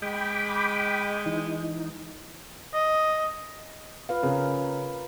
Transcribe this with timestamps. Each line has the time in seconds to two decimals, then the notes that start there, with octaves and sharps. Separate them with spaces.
0.02 G#3 G5 B5 D6
1.26 E3 D#4
2.74 D#5
4.09 F4 B4 F5
4.23 C#3 A#4